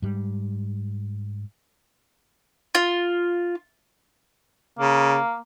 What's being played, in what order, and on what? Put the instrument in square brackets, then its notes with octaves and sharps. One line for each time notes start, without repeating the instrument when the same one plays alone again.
[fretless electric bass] G#2 G3
[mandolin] F4
[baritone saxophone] C#3 [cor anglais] A#3